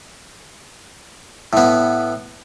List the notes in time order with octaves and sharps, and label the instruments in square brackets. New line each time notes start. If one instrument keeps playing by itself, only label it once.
[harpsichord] A2 B3